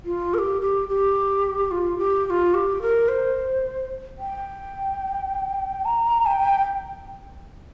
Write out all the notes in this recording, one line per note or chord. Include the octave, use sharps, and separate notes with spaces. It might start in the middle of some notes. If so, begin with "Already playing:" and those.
F4
A#4
G4
G4
G4
F4
G4
G4
F4
G4
A#4
C5
G5
A#5
G5